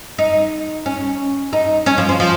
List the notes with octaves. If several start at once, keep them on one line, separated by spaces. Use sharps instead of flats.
D#4
C#4
D#4
C#4
F3
F3
F3